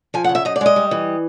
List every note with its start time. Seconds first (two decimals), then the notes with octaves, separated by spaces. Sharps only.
0.14 F3 G#5
0.24 F#5
0.29 C#3
0.35 E5
0.45 F#2 D#5
0.56 D5
0.61 G#3 D#5
0.76 G3
0.91 E3